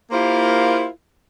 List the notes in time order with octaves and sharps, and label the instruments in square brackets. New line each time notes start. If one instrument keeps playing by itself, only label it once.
[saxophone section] A#3 E4 F4 G4 A#4 C5